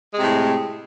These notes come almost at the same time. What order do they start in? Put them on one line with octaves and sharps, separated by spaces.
G#3 C3 A2